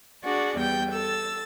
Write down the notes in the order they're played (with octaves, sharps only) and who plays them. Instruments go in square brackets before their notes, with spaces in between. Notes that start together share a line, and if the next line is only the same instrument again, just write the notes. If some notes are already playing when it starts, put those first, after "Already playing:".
[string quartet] D4 F#4 G#4 D5
E2 G3 G5 G6
A4 E6 A6